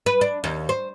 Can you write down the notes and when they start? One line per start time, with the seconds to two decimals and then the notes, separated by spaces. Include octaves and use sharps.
0.06 B4
0.21 D4
0.44 D#2
0.69 C5